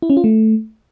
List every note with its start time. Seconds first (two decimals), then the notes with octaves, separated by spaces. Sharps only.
0.02 E4
0.10 C#4
0.17 F4
0.24 A3